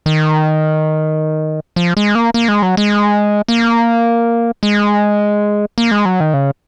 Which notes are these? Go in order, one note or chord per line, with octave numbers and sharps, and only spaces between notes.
D#3
F3
G#3
A#3
A#3
G#3
F#3
G#3
A#3
G#3
A#3
G#3
F#3
D#3
C#3